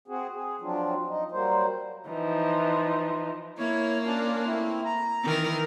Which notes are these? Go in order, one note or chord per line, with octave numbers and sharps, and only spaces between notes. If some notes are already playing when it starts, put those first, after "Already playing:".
C4 F#4 G#4
G#4
F3 F#3 C4 D4 F4
D#4
F#3 G3 A#3 C5
E3 F3 D#4
A#3 E4 C#5
C#4 D4 F4
A3 C4 E4
A#5
D#3 E3 A#4